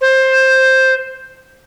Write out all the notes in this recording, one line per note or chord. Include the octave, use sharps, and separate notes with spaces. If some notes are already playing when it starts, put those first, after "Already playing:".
C5